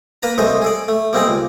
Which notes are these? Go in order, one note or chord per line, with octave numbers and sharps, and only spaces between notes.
A#3 B4 A5 A#5
C2 G#3 A3 C5 D#5
G#4 A4 D5
A3
G3 A#3 C4 D#4 G#4 D5
C#2